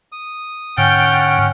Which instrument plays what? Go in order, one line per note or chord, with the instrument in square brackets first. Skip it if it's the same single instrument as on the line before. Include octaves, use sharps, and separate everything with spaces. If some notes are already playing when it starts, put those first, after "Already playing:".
[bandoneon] D#6
[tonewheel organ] G#2 D3 [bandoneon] C#4 F#5 F6 [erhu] G5